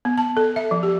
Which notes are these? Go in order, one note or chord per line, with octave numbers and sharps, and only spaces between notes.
B3
A5
A4
E5
F3
G4